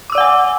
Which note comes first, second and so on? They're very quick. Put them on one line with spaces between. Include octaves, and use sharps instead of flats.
D6 E6 D5 F#5 G#5